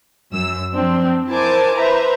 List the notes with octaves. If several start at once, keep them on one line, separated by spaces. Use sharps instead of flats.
F#2 E6
F3 C4 D4
E4 A#4 C5 G#5 A5 D6
B4 C5 E5 A#5